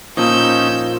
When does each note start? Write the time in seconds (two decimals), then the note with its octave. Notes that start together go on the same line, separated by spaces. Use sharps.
0.17 A#2 F3 C#4 D#4 F4 E6 G6